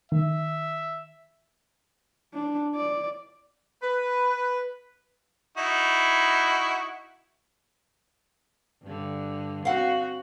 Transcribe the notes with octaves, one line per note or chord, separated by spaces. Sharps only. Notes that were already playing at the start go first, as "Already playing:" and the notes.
D#3 E5
D4
D5
B4
D#4 E4 F#4
G2 D3
C4 F#4 F5 F#5